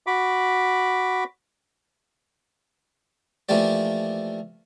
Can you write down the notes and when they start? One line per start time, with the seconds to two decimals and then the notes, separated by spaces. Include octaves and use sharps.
0.07 F#4 B5 D6
3.49 E3 F3 A3 A#3 G4 D5